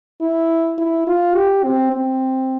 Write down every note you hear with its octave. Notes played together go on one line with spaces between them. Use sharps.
E4
E4
F4
G4
C4
C4